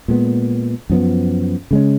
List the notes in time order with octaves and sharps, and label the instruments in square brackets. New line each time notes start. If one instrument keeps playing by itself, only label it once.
[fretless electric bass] A#2 G#3 B3
F#2 F3 B3
C#3 G#3 C#4